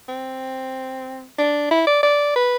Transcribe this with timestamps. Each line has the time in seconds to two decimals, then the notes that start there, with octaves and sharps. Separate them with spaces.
0.09 C4
1.38 D4
1.71 E4
1.87 D5
2.03 D5
2.36 B4